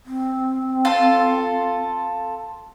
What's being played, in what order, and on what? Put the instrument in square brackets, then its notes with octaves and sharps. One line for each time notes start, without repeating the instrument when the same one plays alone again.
[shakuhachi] C4
[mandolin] F4 A4 C6